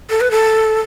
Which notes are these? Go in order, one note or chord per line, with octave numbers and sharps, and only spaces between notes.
A4
B4
A4